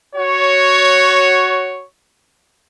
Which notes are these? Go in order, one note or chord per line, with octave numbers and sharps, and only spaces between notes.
F#4 C#5